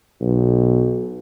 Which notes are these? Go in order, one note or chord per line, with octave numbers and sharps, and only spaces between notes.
B1